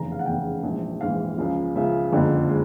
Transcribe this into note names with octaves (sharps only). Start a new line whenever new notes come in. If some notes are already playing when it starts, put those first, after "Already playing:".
Already playing: F1 E2 C#3 A#5
F5
F#5
F1 E2 C#3 G5
A#1 G#2 E3
A#1 G#2 E3 F5
C#2 C#3 F3
C#2 C#3 F3 E5
F#1 F2 D3 F3 G#3
G#3